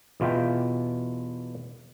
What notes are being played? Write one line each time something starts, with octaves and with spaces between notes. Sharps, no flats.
E2 B2 F4 E5 G5